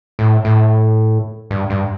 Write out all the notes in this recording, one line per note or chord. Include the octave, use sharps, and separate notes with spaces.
A2
A2
G2
G2